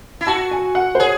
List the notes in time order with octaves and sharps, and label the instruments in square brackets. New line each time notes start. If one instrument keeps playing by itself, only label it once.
[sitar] E4
[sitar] F#4 [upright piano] A5
[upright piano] G#5
F#5
C5
[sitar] G#4 [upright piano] C#5